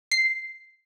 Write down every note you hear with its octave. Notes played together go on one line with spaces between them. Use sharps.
C7